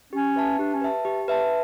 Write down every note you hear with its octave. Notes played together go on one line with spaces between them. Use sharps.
C#4 G4
B4 E5 A5
D4 G4
C#4
B4 E5 A5
G4
B4 E5 A5